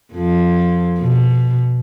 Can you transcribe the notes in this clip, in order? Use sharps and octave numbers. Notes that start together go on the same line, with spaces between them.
F2 F3
B2